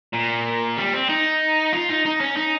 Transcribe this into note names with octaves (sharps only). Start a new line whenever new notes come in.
A#2
G3
C4
D#4
F4
D#4
D#4
C#4
D#4